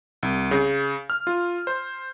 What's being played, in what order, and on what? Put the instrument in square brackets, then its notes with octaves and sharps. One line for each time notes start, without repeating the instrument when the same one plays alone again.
[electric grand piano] C2
C#3
F6
F4
C5